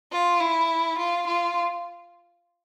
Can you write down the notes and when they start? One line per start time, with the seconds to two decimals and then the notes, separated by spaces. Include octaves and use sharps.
0.12 F4
0.41 E4
0.99 F4
1.28 F4